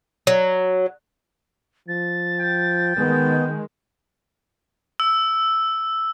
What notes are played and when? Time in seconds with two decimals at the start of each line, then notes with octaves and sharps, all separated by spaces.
0.27 F#3
1.88 F3 A6
2.40 G5
2.97 D#3 G#3 B3
5.00 E6